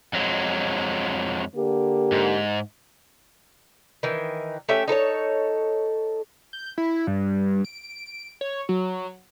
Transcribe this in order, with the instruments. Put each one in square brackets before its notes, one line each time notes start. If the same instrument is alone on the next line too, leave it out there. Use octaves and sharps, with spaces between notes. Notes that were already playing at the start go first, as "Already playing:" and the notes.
[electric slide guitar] F2 F#3 G#3
[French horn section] D3 A#3 G4
[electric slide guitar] G#2
[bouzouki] D#3 E3
A3 C#4 G4 E5
D#4 A4 C5 C#5
[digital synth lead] G6
E4
G2
D7
C#5
F#3